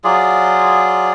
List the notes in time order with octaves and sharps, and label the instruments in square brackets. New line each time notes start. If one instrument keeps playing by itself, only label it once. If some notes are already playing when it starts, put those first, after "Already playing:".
[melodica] F#3 F4 G#4 D5